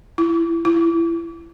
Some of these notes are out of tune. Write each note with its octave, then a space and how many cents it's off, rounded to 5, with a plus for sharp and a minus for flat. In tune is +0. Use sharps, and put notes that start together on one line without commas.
E4 +20
E4 +25